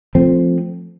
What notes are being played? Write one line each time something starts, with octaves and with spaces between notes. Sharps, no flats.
F3 A3 C4